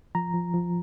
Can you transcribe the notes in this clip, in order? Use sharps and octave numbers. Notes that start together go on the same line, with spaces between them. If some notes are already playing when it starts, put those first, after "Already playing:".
F3 A#5
F3
F3